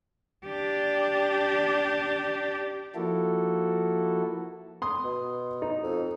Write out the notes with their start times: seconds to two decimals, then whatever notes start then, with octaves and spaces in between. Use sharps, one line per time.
0.46 D4 G4
2.95 F3 A#3 E4 F#4 A4
4.82 C6 D#6
5.04 B2
5.62 D#4
5.83 F2